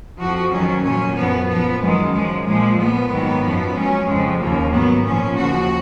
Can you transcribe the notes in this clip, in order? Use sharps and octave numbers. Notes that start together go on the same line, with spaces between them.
F2 F3 F#4
F2 D#3 F#3 C#4
A#2 F#3 C#4
F#2 F3 B3
A#2 F3 B3
F#2 D#3 F#3 G#3
F#2 F3 G#3
A#2 F3 G#3
A#2 F3 B3
G#2 D#3 F#3
F#2 F3
G#2 F#3 C#4
F2 C#3 F3 G#3
D#2 C#3 F3 A#3
G#2 D#3 F#3 B3
A#2 F3 C#4
D#2 C#3 F3 F#4